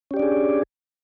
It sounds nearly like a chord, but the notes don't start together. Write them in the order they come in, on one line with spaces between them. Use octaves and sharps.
C#4 G4 D5 D4 G#4